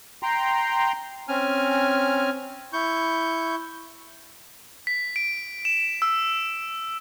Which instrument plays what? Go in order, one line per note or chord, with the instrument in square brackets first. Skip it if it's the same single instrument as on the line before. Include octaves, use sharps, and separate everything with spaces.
[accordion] G5 A#5 C6
[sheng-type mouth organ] C4 C#4 G#5 F6
E4 C#6 G6
[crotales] B6
D7
E7
E6